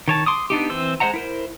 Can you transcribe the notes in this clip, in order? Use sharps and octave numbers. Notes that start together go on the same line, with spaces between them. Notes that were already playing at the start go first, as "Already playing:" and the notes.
D#3 C#5 A5
C6 D6 D#6
B3 D4 D#4 G4
E3 C4 C5 E6
G#3 C5 E5 F#5 A#5
E4 A#4 C5